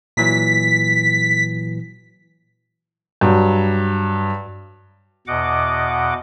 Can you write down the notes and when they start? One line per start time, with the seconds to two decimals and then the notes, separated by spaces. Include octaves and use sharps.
0.17 A#2 E3 F#3 B6
3.21 G2 F#3
5.27 E2 B2 D#5 F#5 D6